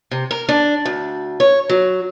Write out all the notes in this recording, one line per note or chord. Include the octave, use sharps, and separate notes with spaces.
C3
A#4
D4
D2
C#5
F#3